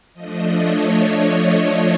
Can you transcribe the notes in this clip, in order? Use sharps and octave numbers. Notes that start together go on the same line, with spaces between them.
F3 A3 D4 D#5
C#5